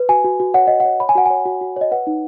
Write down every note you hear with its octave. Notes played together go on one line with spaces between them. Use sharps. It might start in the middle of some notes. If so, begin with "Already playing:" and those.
Already playing: B4
F#4 G#5
F#4
F#4
C#5 F#5
C#5 D#5
C#5 F#5
C#5 B5
G#5
F#4 F#5
C#5 G#5
F#4
F#4
C#5 D#5
B4 F#5
D#4